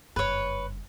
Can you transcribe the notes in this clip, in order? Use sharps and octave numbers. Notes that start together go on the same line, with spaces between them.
F#1 G2 B4 C#5